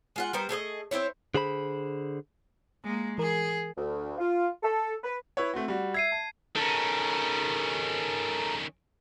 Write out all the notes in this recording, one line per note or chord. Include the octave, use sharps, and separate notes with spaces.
G#3 F4 F#5
G3 B3 A#4 C5
A3 G#4 B4 D#5
C4 C#4 E4 C#5
D3 G#4 C5 B5
G#3 A#3
E3 G#4 A#4
D2
F4
A4
B4
E4 B4 C#5
A3 C4 F#4
G3 F#4
E5 G#6 C7 D#7
A5
D#3 C#4 A4 A#4